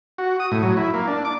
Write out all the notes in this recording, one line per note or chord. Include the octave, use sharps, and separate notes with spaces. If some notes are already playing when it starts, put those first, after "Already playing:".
F#4
D#6
A2
F#3
E4
A#3
D4
D6